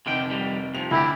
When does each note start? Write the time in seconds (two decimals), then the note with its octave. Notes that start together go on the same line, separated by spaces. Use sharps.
0.06 F1 D3 D#3 G5
0.30 D#3 G3
0.75 C3 F3 F7
0.91 D2 C3 E4 G4